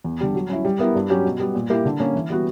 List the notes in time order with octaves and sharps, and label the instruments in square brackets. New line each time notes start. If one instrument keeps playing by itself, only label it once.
[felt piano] E2
D3 G3
F#3
C#4 E4
G3
B3 E4 A#4
G2
F#3 C#4 G4
B2
G3 B3
A#2
A#3 E4 G4 A#4
D3
A#3 C#4
E3
G3 B3 F#4